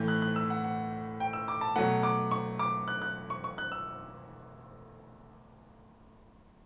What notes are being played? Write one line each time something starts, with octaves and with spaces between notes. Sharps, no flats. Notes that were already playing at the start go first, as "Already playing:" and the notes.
Already playing: A2 E3 A3 G6
F#6
F#6
E6
F#5
F#5
G5
E6
D6
A5
B2 F#3 A3 F#5
D6
C#6
D6
F#6
F#6
C#6
C#6
F#6
E6